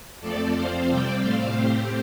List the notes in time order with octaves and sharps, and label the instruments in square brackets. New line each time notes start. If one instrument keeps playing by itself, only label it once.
[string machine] F2 F3 A3 C4 A4 D5
F2 F3 C4 C5 F5
C3 G3 C4 D5 G5
A2 A3 C4 C5 F5
A2 A3 C4 G4 C5